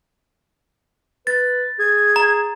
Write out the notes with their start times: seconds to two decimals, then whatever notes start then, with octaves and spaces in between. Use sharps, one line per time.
1.27 B4 A6
1.79 G#4 G#6
2.16 A#5